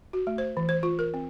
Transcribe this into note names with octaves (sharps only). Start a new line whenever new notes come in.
F#4
A3
C5
E3
C5
F4
A#4
C4